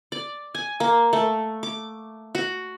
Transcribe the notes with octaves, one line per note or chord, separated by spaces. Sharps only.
D5
G#5
A#3
A3
D6
F#4